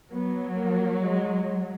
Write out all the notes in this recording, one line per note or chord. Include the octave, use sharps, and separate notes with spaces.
F#3 B3
A#3
G#3